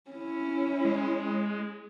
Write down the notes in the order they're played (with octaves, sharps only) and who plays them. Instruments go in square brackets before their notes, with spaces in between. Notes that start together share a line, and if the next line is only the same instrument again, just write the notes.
[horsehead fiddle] C#4 E4
[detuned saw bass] G#3